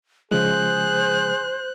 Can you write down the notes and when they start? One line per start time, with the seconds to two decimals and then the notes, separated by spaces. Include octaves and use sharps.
0.31 C#3 F3 G#3 G#4 C5 F#6